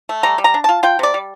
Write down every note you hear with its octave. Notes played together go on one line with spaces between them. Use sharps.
A3
G3 A#5
G3
A#5
D4
F4 A5
F4 G5
C3 D5
G3